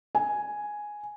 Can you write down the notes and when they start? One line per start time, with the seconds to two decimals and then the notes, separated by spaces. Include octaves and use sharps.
0.15 G#5